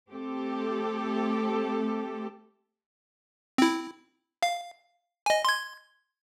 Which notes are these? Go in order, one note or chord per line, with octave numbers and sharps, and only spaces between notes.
A3 C4 G4 A4
C4 E4
F5
D#5 G#5
C6 G#6